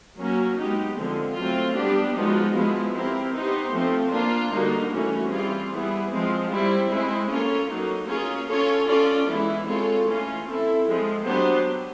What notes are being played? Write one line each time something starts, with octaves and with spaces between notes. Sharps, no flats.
F#3 A#3 C#4 F#4
G#3 B3 D#4 G4
D3 F3 G#3 C4
F#3 A3 C4 F4
G3 B3 D4 G4
F3 G#3 B3 D#4 F#4
F3 G#3 B3 E4
C4 E4 G4 A#4
B3 D#4 G4 C5
F3 A3 C4
A#3 D4 F4
D3 G3 A#3 D#4 F#4
E3 A3 C#4 F#4
E3 G3 C4 F4 G#4
G3 B3 E4 G#4
F3 G#3 C4
G3 C4 E4
G#3 C4 E4 G#4
A#3 C#4 F4 A4 C#5
F#3 A#3 D#4
A#3 C#4 F4 G#4 C#5
C#4 F4 A4 C#5
C#4 F4 A4 D5
E3 G#3 B3 E4
G#3 C4 F4 A4 C#5
E3 A3 C#4 F4
C4 E4 A4
F3 G#3 C4
F#3 B3 D4 G4 C5